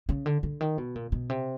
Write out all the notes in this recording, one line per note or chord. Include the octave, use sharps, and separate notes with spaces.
C#3
D3
D3
D#3
B2
A#2
B2
C3